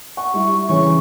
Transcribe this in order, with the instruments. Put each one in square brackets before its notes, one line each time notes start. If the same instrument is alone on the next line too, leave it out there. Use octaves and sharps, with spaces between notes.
[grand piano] F#5 [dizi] C#6
[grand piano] G3 E4
[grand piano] C#3 E3 C#4 [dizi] C#6